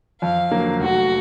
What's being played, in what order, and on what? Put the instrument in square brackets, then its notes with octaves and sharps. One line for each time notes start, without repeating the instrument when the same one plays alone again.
[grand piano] F2 [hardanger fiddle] F5
[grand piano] D3 F#3 A#3
[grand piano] F1 [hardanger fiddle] F#4